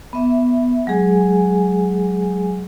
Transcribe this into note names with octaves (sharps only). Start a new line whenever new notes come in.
B3 E5
F#3 G#3 G#4 G#5